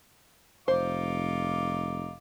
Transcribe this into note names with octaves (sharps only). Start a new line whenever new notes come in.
F1 D#4 F4 C5 D6